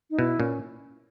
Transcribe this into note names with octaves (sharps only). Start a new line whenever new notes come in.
D#4
B2 E4
A#2 C#4